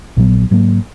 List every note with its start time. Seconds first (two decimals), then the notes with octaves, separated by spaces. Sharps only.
0.16 A#1 A#2 F#3 B3
0.51 G#2 F#3 A#3